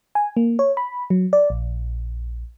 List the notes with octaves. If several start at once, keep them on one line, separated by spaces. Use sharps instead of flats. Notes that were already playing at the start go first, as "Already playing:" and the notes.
G#5
A#3
C#5
B5
F#3
D5
A#1